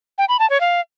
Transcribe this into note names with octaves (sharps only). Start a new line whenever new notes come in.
G5
B5
A5
C#5
F5